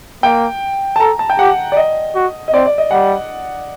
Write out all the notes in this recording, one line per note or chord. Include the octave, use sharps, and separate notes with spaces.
A#3 G5
A5
A4 A#5
A5
G5
G4 F#5
D5
D#5
F#4
D#5
C4 D5
D5
D#5
G3 F#5